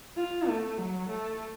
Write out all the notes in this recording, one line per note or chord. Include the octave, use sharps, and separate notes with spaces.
F4
A3
F#3
A3